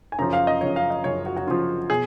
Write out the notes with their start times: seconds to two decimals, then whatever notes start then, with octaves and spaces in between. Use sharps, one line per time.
0.12 G#5
0.18 F#2 C#3 F3 A#5
0.33 F5
0.47 D#5
0.61 F#2 C#3 F3 C#5
0.76 F5
0.90 D#5
1.04 F#2 C#3 F3 C#5
1.26 F#4
1.37 F#4
1.47 F#2 C#3 F3 F4
1.89 B2 G#4